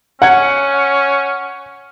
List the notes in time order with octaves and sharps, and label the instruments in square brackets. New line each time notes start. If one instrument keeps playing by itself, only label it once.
[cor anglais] C#4 [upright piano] F#5 G#6